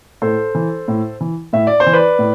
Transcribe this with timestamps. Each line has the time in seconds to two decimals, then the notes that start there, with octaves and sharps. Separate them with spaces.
0.22 A2 A4 C5
0.55 E3
0.88 A2
1.21 E3
1.53 A2 E5
1.67 D5
1.80 C5
1.86 E3
1.93 B4 D5
2.19 A2